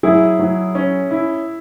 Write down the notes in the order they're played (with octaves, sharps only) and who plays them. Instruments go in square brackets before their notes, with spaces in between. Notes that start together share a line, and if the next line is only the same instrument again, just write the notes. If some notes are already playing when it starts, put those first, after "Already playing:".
[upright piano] F#3 [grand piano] E4 G#4
[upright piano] F#3
C#4
E4